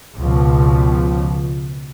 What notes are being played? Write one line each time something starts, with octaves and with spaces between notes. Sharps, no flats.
C#2 B2 F3